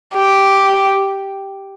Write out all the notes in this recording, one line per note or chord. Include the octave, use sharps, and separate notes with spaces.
G4